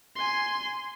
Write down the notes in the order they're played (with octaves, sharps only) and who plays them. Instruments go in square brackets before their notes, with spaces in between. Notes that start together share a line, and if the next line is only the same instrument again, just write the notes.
[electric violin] G#5 C6